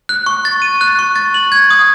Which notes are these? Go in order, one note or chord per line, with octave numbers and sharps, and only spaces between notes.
F#6
C#6
A6
D#7
F#6
C#6
A6
F#7
G#6
D#6